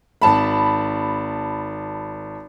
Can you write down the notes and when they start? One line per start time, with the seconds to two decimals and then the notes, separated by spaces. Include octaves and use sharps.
0.22 G#1 A5 B5